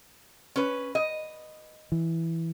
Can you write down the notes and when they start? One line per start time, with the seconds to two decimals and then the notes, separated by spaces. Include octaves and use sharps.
0.56 C#4 B4
0.95 D#5
1.92 E3